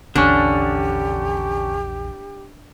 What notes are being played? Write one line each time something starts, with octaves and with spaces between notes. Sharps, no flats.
A#1 E2 D3 C#4 D4 G4